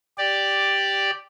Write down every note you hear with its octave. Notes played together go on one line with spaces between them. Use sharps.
G4 D5